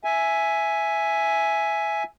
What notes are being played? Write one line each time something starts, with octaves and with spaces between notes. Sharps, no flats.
E5 G#5